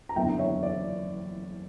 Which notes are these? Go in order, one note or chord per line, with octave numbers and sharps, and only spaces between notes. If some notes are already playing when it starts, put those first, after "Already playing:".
A#5
F#1 E2 D3 E5 G5
C#5 E5
D5